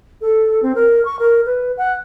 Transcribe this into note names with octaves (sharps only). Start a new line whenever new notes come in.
A4
C4
A#4
C#6
A#4
B4
F#5